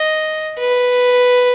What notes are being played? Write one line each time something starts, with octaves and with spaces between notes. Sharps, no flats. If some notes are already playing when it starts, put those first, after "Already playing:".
Already playing: D#5
B4